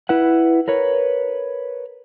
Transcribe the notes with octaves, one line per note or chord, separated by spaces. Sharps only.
E4 B4 F#5
A#4 B4 C#5